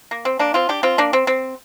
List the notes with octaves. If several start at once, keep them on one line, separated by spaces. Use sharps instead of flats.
A#3
C4
A#3 D4
C4 F4
D4 G4
C4 F4
A#3 D4
C4
C4